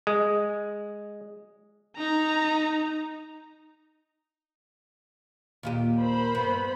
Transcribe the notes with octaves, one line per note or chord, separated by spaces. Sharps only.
G#3
D#4 A#5
D#2 A#2 G4
A#4 C5 B5
G2 B3